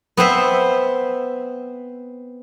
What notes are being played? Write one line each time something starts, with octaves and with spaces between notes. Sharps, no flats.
B3 C4 C5 E5